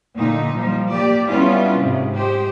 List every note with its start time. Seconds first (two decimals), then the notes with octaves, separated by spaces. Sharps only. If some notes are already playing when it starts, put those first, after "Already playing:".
0.17 A#2 D3 F3 D#4
0.56 F3 G3
0.91 A#3 G4 D5
1.28 G3 B3 C#4 D4 E4 F4
1.76 G#2 C3
2.14 G#3 G4 C5